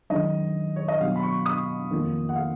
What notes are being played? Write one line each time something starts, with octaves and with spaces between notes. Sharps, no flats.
F#2 D#3 G#3 D#4 D#5
C#5
D#5
B2 F#3 B3 F5
B5
C#6
D#6
F2 D#3 A#3 F4
F#5
F5